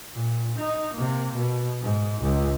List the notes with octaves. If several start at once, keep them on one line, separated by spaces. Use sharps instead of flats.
A#2
D#4
C3 A#3
B2
G#2
C#2